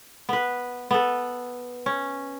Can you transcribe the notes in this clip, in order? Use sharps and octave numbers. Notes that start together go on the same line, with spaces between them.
B3 B4
B3 A4
C#4